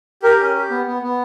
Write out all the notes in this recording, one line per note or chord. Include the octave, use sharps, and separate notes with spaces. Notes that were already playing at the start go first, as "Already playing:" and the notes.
G4 A#4
C#4
G4
B3
B3
B3